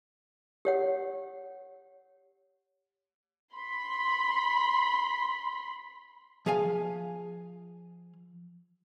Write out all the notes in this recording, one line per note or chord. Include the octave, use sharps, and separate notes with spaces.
G4 C#5 F#5
B5 C6
F3 G#4 F5 G#5